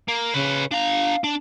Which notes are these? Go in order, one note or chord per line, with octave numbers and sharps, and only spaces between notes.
A#3
C#3 B4 C#5
D4 F5 A#5
D4